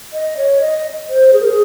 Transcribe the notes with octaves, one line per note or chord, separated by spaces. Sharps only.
D#5
C#5
D#5
C5
G#4
A#4
G#4